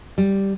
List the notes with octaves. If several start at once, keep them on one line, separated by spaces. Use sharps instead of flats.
G3